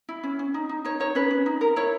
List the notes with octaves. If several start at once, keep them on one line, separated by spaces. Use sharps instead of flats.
E4
C#4
C#4
D#4
D#4
D#4 C#5
D#4 C#5
C#4 B4
C#4
D#4
A#4
E4 C#5